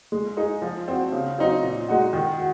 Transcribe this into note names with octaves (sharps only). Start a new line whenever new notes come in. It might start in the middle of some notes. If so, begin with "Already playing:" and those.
G#3
D#4 G#4
F3
C4 F#4
C#3
F#3 C4 D#4
A#2
G#3 D#4 F#4
D#3
F#4